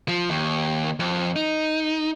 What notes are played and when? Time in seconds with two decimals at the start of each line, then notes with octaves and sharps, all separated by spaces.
0.08 F3
0.30 D#2
1.00 F2
1.36 D#4